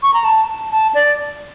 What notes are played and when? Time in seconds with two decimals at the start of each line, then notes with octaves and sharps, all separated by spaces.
0.03 C#6
0.14 A#5
0.24 A5
0.71 A5
0.94 D5